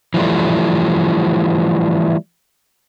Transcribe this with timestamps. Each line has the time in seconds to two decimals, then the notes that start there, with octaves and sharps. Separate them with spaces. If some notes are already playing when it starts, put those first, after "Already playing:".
0.14 E3 F3 G3 A3